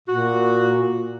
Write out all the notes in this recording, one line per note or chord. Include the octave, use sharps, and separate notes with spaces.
A#2 F#4